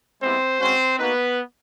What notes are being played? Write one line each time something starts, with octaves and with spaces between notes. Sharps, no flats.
G#3 B3 C4 E4 G4 C5
G#3 C4 C#4 F#4 C5
A#3 B3 D#4 F#4 B4